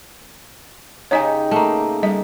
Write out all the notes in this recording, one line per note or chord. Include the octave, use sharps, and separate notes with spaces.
C#3 D#4 G4 C#5 D#5 G#5
A3 A#3
G3 D#5